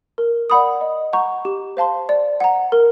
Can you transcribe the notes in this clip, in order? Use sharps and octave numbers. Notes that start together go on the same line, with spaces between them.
A#4
D5 F#5 B5 D#6
D#5
F#5 A#5 C#6
G4
C5 F5 A5 C6
D5
F#5 A#5
A#4